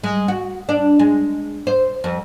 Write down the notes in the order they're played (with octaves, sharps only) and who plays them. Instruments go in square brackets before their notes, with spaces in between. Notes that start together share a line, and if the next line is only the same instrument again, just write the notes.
[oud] G#3
F#4
D4
G#3
C5
F2